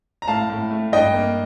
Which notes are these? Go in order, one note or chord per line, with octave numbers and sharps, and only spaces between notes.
A#5
A2 F5 A5
A2
A3
G2 D#5 G5
A#3